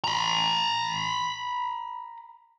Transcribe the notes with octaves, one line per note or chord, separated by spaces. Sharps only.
A#5 B5